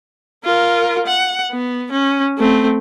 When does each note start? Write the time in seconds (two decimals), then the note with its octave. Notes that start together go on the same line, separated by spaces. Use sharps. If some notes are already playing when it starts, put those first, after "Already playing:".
0.45 F4 A#4
1.07 F#5
1.51 B3
1.92 C#4
2.38 A3 C4